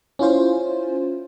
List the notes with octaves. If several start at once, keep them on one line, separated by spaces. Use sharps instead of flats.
C#4 E4 F4 C5